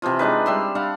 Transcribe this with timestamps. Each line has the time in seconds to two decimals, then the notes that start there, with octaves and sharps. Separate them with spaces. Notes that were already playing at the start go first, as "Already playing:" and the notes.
0.02 C3 E3 F3 F4
0.19 G#3 D4 D#4 B4
0.46 G3 E5 C6
0.75 D4 F5 F#5